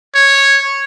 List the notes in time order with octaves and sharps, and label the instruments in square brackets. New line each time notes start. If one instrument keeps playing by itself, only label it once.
[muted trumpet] C#5